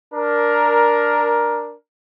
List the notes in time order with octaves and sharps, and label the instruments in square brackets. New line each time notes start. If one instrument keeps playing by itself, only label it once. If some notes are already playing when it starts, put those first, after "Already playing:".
[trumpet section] D4 A#4